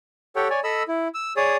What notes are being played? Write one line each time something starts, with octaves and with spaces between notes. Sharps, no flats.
G4 A4 C#5 F#5 G5
C#5 D5 G#5
A4 D#5 B5 E6
E4
E6
G#4 C#5 D5 D#6